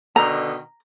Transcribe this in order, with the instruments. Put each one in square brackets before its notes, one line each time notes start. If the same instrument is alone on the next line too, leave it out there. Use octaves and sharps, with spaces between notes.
[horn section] B2 D3 D#3 [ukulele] A#5